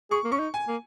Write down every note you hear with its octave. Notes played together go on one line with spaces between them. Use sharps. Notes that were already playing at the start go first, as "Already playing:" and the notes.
G#4 C#6
A#3
C#4 C#6
D#4
G#5
A#3